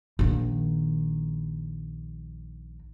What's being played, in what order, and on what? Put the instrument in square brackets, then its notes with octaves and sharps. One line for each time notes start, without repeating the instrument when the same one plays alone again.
[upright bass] A#1 D#3